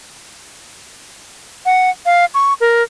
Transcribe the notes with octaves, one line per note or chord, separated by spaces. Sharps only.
F#5
F5
C#6
A#4